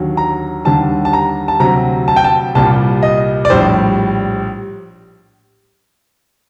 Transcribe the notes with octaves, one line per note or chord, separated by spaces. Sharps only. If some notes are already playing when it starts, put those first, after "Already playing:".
Already playing: D#2 D3 F#3
A#5
D#2 D3 G3 A5
A5
A#5
A5
D2 C3 F#3 A#5
A5
G5
A5
C2 A#2 G3 A5
D#5
D5
A#1 A2 G3 C5